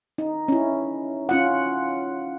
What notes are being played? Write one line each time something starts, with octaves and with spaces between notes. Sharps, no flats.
D#4
C#4 E4
C#4 F4 F#5